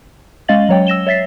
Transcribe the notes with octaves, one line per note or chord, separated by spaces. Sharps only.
G#3 C#4 D#5 F5 A6 F#7
F#3 C#5 G5
E6 A#6 E7 G7
C#5 E5 A6 B6 C7